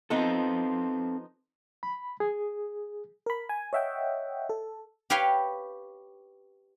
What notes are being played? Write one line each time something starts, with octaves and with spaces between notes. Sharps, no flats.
F3 B3 C4 D#4 A4
B5
G#4
A#4 B5
G#5
C#5 D#5 E5 F#5 G5
A4
G4 B4 C#5 F5 G5